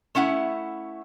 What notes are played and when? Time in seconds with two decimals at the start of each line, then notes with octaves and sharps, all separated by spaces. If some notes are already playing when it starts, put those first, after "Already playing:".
0.15 A3 C#4 E4 F#5